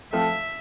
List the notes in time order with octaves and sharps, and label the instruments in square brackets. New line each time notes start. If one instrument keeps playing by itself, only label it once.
[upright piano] F3 A3 C4 F4 A4 [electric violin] E5